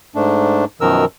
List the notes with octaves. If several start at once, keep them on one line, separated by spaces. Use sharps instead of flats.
G#2 A3 D4
F#2 B2 D#3 F3 A#4 E6